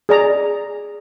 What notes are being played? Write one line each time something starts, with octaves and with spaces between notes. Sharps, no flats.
G#4 D5 A#5